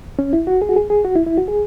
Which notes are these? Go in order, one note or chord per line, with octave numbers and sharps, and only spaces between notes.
C#4
E4
F#4
G#4
F#4
G#4
G#4
F#4
E4
E4
F#4
G#4